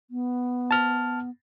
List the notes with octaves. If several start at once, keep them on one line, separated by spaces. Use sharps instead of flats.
B3
A5 F6